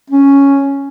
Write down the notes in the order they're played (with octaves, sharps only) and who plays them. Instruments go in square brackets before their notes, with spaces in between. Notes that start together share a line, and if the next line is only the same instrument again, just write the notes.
[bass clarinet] C#4